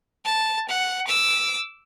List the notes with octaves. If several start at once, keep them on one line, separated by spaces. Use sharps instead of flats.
A5
F#5
D6 E6